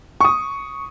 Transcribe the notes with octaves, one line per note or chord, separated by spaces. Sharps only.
C#6 D#6